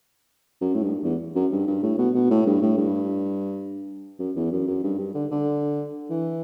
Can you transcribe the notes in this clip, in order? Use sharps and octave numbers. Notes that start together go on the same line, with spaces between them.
F#2
A2
G2
E2
F#2
G2
G2
A2
B2
B2
A2
G2
A2
G2
F#2
E2
F#2
F#2
G2
G2
D3
D3
E3